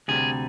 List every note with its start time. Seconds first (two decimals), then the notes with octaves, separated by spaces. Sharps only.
0.08 D2 C3 G3 G#4